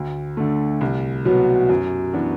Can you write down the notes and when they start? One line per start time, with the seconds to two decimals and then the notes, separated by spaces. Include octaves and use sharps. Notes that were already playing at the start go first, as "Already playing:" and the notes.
Already playing: D2
0.37 D3 A3
0.81 C2
1.25 B2 F#3 B3
1.69 F#2
2.14 E3 B3 D4 F#4